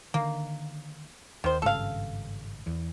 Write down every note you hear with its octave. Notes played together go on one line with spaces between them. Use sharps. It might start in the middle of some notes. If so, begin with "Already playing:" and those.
D3 D#3 A#3
D#2 D#3 C5
G#1 G2 C#3 A4 F5
E2